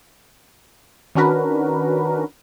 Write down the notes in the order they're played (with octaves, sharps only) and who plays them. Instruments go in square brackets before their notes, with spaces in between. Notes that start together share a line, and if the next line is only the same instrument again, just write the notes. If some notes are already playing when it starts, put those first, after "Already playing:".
[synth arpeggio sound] D#3 C#4 D4 F#4 A#4 B4